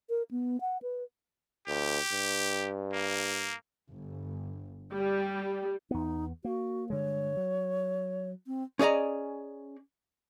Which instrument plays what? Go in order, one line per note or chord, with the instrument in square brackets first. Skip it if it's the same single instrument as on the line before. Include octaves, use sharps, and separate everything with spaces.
[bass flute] A#4
B3
F#5
B4
[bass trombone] D2 [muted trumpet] G4
[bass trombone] G2
[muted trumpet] A#3
[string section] G1
G3
[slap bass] E2 B3 [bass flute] D#4
[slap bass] A#3 [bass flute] F#4
[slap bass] G2 D3 G#3 [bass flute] C#5
[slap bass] F#3
[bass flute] C4
[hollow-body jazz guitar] C#4 G#4 D5 D#5 A#5